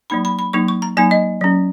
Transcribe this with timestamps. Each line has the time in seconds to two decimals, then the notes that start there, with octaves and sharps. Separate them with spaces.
0.10 F#3 A#3 D#4 B5
0.25 B5
0.39 B5
0.53 F#3 A#3 D#4 C#6
0.68 C#6
0.82 A#5
0.97 F#3 A#3 D#4 G#5
1.11 D#5
1.41 F#3 C#4